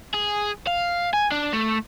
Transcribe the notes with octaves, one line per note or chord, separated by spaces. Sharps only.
G#4
F5
G#5
D4
A3